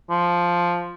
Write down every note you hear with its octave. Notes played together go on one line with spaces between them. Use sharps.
F3